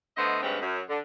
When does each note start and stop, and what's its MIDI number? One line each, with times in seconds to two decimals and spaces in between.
0.17 0.42 50
0.17 0.42 57
0.17 0.42 59
0.17 0.42 72
0.17 0.42 75
0.43 0.61 38
0.43 0.61 43
0.43 0.61 56
0.43 0.61 60
0.43 0.61 61
0.43 0.61 71
0.61 0.81 42
0.89 0.99 50